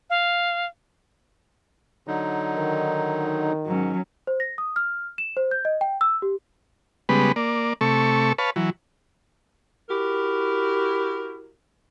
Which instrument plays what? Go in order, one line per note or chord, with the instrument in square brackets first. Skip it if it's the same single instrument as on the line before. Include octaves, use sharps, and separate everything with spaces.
[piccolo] F5
[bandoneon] D3 F#3 D#4
[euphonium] D#3
[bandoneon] G#2 [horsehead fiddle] F#3 C#4
[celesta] C5
A#6
D#6
F6
E7
C5
G6
D#5
G5
E6
G4
[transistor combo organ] C#3 G3 G#3 B3 B4
A#3 D5
C3 A3 A4 C#6
B4 C#5 F5 A5
E3 F#3
[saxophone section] E4 F#4 G4 A#4